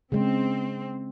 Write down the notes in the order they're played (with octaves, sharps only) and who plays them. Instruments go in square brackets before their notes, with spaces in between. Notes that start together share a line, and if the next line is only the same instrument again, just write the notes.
[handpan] C#3 G#3 [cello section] C4